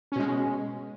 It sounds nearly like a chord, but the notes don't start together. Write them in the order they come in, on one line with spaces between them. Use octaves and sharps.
C#4 B2 G#3